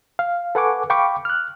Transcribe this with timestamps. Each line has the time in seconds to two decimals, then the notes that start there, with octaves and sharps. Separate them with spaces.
0.19 F5
0.55 A4 B4 F#5 G#5 C#6 D6
0.90 F5 G5 B5 C#6 D6
1.25 F6 F#6